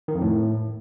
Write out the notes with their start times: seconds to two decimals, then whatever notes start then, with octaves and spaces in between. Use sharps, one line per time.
0.08 D#3
0.15 F2
0.22 A2